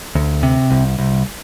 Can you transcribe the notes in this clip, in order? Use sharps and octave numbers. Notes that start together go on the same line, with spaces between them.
D2
C3
C2
C2